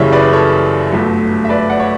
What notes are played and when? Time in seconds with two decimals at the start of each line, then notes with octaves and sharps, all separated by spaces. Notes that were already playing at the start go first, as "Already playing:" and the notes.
Already playing: F#1 F#2 C#3 E3 G3 C#5 E5
0.13 B4 D5
0.33 A4 C#5
0.92 G1 G2 F#3 A3
1.45 E5
1.49 B4 D5
1.70 D5 F#5
1.80 C#5